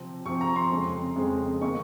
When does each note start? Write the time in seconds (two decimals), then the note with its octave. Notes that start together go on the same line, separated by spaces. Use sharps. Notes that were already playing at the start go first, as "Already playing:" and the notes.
Already playing: C3 F3 C4
0.26 C3 F3 C4 C#6
0.41 A#5
0.56 C6
0.71 F2 C#3 G#3 C4
1.16 F2 C#3 G#3 C4
1.61 D#3 A#3 C#6